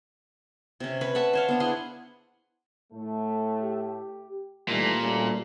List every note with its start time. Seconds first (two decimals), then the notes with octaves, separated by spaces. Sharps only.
0.80 C3 C#4
1.01 B4 C#5
1.15 E5 F#5 A5 B5
1.33 C5 C#5 F5
1.48 B3 D4
1.60 E4 G#4 F#5 C6
2.92 A2 A3
3.62 G4
4.68 A#2 D#3 E3 G3 A3
5.01 D2 G3 C#4 A4